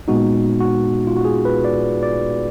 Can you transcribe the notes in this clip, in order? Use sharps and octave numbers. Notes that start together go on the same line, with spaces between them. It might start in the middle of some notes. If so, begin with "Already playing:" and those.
A#2 G#3 B3 D#4 F#4
F#4
F4
F#4
G#4
B4
D5
D5